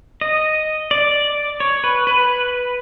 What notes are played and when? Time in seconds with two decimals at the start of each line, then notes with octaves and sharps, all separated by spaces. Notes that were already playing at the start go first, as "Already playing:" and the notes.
0.21 D#5
0.91 D5
1.60 C#5
1.84 B4
2.07 B4